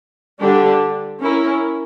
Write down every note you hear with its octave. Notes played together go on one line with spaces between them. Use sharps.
D3 G3 D4 G4
C#4 E4 A#4